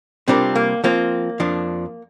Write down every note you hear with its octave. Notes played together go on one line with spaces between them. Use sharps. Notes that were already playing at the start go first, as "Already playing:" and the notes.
C3 G3 C4 D4 F4 A#4
A#3
F3 A#3 C4 F4
F2 F3 D4